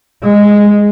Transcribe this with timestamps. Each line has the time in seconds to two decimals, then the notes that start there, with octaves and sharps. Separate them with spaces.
0.23 G#3